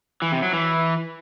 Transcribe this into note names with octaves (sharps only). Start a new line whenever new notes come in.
E3
C3
F#3
E3